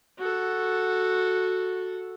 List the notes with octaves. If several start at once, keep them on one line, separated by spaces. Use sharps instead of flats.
F#4 A4